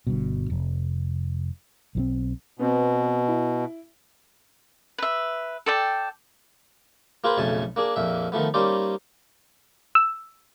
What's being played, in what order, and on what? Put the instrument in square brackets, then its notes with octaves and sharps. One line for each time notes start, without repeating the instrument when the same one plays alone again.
[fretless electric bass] G1 G2 B2
F1
B1 D#3 C4
[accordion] B2 [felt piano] B3 C4
[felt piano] E4
[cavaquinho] B4 E5
A4 D5 G5
[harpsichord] A#3 F4 G#4 B4 C5
B1 F2 C#3 A3 G#5 A5
A#3 D4 G#4
A#1 F2 A#2 E5
D#3 F3 A3 B3
G3 A#3 C#4 D#4 C5 D5
[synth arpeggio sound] E6